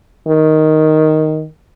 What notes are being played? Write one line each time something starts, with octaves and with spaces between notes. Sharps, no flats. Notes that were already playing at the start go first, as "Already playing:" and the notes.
D#3